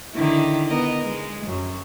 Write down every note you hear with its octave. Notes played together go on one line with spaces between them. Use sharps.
D3 D#3 E4
B3 A#4 D#5
G#3
F#2